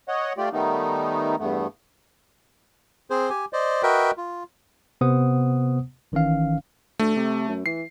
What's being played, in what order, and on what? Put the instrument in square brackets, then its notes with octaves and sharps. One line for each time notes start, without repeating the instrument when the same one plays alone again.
[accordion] C#5 D#5 F#5
A3 F4 G4 D5
D#3 G3 A3 B3 D#4
E2 G2 A3 B3
[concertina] C4 G#4 C5
G4 G#5
C5 D5 D#5
F#4 A#4 B4 D#5 E5 G5
F4
[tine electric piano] C3 B3 C5 F#5 D#6
G1 D#3 E3 C#4 F5
[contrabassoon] D2 [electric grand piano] A3
[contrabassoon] C3
F#2
[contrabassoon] E3 [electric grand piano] C7